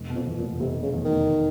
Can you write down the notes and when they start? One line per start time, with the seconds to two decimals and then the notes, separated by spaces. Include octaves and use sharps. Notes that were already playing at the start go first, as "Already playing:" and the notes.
Already playing: F1
0.10 B2
0.15 F2
0.26 E2
0.38 A#2
0.43 F1
0.60 F1 C3
0.77 B2
0.83 C#3
0.93 E2
1.05 D#3
1.11 F1